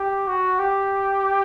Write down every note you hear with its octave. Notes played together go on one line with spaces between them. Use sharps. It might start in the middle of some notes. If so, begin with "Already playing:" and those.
Already playing: G4
F#4
G4